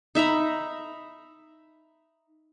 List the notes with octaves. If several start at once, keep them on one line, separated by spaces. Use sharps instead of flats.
D#4 E5 A#5 B5